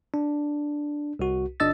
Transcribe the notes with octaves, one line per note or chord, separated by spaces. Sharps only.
D4
C2 F#4
G1 D4 D#5 E6 A6